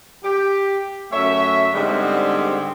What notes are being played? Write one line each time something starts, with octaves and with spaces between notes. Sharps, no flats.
G4
F#2 A3 C#5 E5
G#2 D3 G3 G#3 B3 C4